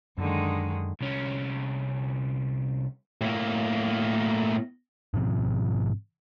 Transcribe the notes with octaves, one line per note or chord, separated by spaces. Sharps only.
F#2 D3 D#3 G#3
C2 C#4
A2 A#3
G#2 B2 F3 C4